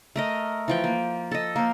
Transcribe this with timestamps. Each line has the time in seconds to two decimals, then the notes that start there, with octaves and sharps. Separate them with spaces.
0.16 A3 A#4 D#5
0.68 E3 F3 G5
0.84 A#3
1.31 A4 D#5
1.56 A#3 C5